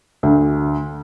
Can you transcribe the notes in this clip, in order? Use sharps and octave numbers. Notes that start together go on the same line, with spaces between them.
D2